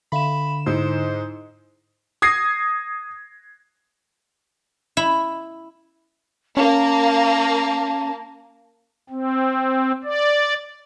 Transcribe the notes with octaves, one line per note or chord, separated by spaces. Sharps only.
D3 E5 F5 B5 C6 E7
G#2 D#4 E4 C5 E6
D#6 G#6 A#6 C7
E4
A#3 C#4 A5
C4
D5